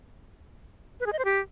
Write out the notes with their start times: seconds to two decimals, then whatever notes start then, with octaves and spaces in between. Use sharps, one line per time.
1.00 B4
1.06 G#4
1.13 D#5
1.19 C5
1.25 G4